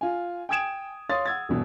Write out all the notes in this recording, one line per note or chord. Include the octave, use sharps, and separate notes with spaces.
F4 G#5
G5 G#5 D#6 G#6 D7 E7
C#5 F5 C6 D#6 A6
F#5 E6 G#6 A6
G1 E2 B2